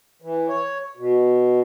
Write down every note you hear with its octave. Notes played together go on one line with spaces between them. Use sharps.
E3
C#5
B2